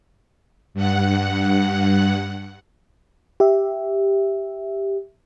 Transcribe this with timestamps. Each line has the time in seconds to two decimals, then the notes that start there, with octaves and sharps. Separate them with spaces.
0.74 G2 F#5
3.40 G4 E5